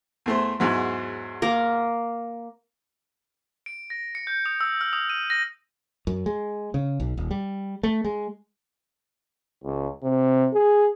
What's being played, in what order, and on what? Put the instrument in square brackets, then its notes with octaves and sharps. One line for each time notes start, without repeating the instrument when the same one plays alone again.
[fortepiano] E2 A3 C5
E2 G#2 F#3
[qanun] A#3 A#4
[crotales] D7
A#6
C#7
G6
D#6
E6
F6
D#6
D#7
A#6
[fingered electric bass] F#2
G#3
C#3
B1
D#1
G3
A3
G#3
[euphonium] C#2
C3
G#4